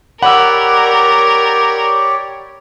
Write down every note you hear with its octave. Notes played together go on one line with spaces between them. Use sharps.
G4 A#4 C#5 D5 F#5 B5 E6